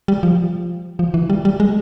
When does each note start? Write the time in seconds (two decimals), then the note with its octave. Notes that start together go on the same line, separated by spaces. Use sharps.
0.08 G3
0.23 F3
0.99 F3
1.14 E3
1.30 G3
1.45 G3
1.60 G#3